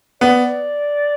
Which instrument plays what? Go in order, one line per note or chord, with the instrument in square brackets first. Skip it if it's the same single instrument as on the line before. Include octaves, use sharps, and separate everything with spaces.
[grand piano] B3 [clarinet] D5